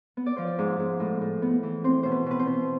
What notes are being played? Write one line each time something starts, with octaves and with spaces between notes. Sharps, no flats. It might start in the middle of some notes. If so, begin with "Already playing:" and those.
B3
D5
F3 C5
D5
G#2
G#2
A2
A2
B3
E3
C4 C5
B2 C5
B4
B2 B4
C5
B2